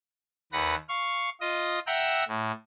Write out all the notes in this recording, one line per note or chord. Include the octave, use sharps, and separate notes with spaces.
D#2 B4 F#5 A#6
F5 C#6
F4 D#5 D#6
E5 F#5 G5 A#5 E6
A2